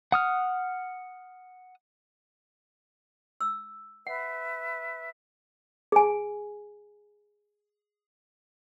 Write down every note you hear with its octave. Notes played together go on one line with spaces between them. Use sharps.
F#5 D#6 F6
E6
B4 E5 F#5
G#4 G#5